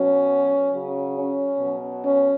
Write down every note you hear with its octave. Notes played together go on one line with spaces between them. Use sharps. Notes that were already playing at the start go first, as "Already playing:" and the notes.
Already playing: B2 F#3 C#4
C#3 F#3
C#4
B2 F#3
C#4